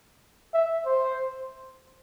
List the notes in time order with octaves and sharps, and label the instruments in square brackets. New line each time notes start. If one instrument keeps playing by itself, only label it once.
[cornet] E5
C5